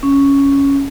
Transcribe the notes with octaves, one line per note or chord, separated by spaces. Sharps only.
C#4